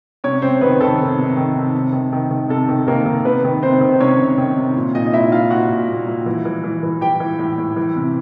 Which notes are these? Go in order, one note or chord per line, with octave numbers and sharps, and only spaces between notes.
C3 C#4 C#5
C3 C4 C5
D#3 B3 B4
D#3 A4
C3
C3
D#3
C3
C3
D#3
D#3
D#3
C3 A4
D#3
D#3 A#3 A#4
D#3
C3 B3 B4
D#3
C3 C4 C5
D#3
C5
C3 C#4 C#5
C3
D#3
C3
A#2
A#2 D#4 D#5
D#5
A#2 E4 E5
A#2 F4 F5
A#2 F#4 F#5
A#2
A#2
A#2
E3
E3
E3
E3
E3 G4 G5
E3
A2
A2
E3
C3